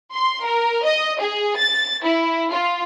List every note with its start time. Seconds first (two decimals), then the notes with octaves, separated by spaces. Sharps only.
0.13 C6
0.44 A#4
0.84 D#5
1.20 G#4
1.56 A6
2.03 E4
2.50 F4